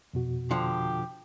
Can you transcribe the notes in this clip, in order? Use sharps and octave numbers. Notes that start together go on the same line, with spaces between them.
F2 B2 F#4
D3 F3 G4